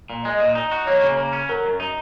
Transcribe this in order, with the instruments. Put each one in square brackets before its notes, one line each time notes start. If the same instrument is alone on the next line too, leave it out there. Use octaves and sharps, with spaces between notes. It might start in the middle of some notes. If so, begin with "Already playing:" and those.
[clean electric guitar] A#2
[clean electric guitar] G#3 [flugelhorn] D#5
[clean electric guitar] A#2
D#4
F#4
[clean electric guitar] A#3 [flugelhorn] C#5
[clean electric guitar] C#3
A#3
C#4
[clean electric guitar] F#3 [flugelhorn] A#4
[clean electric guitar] F#2
D#4